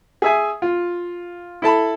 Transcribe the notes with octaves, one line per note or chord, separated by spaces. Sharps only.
G#4 E5 G#5
F4
E4 A4 A5 B5